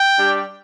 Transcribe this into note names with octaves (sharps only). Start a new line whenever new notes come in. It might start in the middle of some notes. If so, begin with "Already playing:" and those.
Already playing: G5
G3 D4 G4